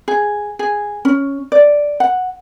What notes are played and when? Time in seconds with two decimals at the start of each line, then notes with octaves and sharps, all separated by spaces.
0.08 G#4
0.59 G#4
1.05 C#4
1.52 D5
2.00 F#5